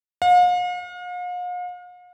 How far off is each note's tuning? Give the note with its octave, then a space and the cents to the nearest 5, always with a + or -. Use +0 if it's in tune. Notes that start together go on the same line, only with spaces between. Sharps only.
F5 +45